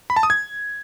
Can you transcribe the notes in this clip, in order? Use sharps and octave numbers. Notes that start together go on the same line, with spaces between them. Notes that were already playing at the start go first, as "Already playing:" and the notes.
B5
A5
D#6
G#6